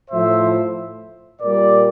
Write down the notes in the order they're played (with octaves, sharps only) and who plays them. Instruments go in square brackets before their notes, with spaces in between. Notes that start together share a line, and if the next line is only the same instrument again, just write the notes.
[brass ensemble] A2 F3 C5 E5
A#2 G3 A#4 D5